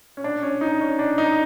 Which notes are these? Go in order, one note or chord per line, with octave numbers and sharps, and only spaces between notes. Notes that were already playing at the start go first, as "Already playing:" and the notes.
C#4
D4
C#4
D#4
C#4
D4
D#4